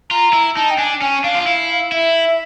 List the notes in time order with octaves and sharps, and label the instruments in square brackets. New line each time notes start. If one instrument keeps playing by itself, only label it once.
[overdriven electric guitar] F4 [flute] A#5
[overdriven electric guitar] E4
[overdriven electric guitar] D#4 [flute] A5
[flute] G5
[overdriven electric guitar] D4 [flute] G#5
[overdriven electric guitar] C#4 [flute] G#5
[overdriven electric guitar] D4 [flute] F5
[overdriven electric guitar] F4
[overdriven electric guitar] E4 [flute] F5
[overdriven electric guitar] E4 [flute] E5